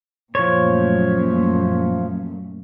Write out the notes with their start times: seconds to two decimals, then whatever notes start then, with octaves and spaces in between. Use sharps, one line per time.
0.35 F#2 A#2 F3 A3 C#5